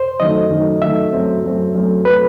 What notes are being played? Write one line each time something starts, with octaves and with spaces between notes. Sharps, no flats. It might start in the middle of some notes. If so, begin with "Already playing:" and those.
Already playing: C5
F#2 D#3 A3 D#5
F#2 D#3 A3
F#2 D#3 A3 E5
F#2 F#3 A3 C4
F#2 F#3 A3 C4
F#2 F#3 A3 C4
F#3 A3 C4 B4